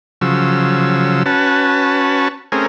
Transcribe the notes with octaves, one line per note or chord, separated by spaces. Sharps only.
C#3 F3 F#3 E6
C#4 F#4 B4 A5
A3 C4 C#4 G#4 A#4